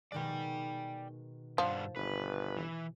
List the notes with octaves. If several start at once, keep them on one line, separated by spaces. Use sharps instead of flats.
B2 D#3 G#3 D5 G5
G2 F3 D4 F#5
G1 B4
E3